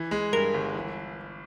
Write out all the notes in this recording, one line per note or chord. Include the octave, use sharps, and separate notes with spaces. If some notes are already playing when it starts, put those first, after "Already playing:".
Already playing: E3
G#3
G2 A#4
G1
E3